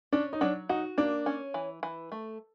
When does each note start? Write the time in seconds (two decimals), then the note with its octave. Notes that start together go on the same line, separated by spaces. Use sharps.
0.13 C#4 D4
0.33 D#4
0.41 F#3 D4
0.69 D#4 F#4
0.98 A#3 D4
1.26 C#4
1.54 E3
1.83 E3
2.12 A3